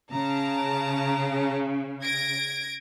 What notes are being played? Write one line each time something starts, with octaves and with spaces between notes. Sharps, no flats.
C#3 A5 A#5
G#6 A#6 D7